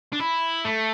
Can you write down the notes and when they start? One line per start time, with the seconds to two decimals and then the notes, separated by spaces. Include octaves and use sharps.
0.13 D4
0.19 E4
0.65 A3